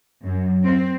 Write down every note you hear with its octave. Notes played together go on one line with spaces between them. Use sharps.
F#2
C4